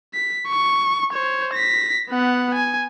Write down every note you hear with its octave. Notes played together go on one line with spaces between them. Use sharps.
B6
C#6
C5 C#5
A#6 B6
B3 F#5
G#5